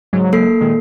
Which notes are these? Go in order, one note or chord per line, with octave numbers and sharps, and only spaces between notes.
G#2 C#3 F#3
A#3 A4 C7
A#2 D#3 G#3